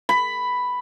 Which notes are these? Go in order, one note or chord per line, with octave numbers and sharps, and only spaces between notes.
B5